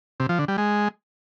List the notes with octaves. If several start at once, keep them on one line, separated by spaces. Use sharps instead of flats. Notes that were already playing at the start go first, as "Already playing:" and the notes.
C3
F3
D3
G3
G#3